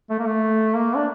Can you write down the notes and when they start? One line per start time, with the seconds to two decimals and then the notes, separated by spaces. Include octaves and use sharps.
0.10 A3
0.19 A#3
0.26 A3
0.75 A#3
0.96 D4